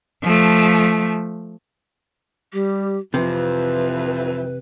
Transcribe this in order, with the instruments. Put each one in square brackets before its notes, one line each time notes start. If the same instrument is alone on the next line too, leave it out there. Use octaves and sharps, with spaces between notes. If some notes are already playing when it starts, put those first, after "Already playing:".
[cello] F3 A3
[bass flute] G3 [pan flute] G4
[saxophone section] F2 E3 [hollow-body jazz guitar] C3 [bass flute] F3 [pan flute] B4